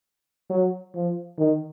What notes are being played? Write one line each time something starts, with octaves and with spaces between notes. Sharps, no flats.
F#3
F3
D#3